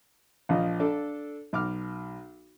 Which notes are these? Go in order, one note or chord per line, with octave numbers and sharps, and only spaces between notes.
A#1 F3 D#5
D4 A4
B1 D6 F6